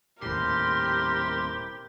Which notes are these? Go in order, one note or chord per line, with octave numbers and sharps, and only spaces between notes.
D#1 A2 C3 E4 G4 A#4 C6